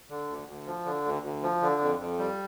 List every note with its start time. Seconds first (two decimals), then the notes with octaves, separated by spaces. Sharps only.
0.10 D3
0.28 D2
0.48 D2
0.67 F3
0.85 D3
1.05 D2
1.23 D2
1.43 F3
1.62 D3
1.81 F2
2.00 F2
2.19 G3